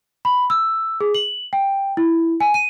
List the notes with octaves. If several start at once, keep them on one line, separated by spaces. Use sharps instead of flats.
B5
E6
G#4
F#7
G5
E4
G#5
D#7